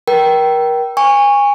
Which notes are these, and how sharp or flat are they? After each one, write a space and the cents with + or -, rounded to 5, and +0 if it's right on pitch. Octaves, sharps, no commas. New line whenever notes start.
A#4 +30 G5 -15
G#5 -25 C#6 +0